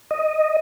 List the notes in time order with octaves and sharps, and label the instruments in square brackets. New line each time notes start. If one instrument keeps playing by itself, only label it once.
[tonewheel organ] D#5